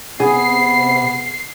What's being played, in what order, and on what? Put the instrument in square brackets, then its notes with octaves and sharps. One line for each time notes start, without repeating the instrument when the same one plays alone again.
[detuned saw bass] C3 [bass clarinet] B3 [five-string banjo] G#4 [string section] C7